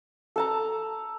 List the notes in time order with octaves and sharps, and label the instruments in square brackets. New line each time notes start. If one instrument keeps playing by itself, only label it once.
[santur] A4 A5 A#5